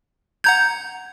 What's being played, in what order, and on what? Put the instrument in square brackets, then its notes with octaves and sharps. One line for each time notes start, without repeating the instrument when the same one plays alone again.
[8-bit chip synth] F#5 A#5 G#6 [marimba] G6